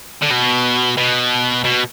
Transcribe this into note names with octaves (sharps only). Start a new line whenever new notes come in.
D3
B2
B2
B2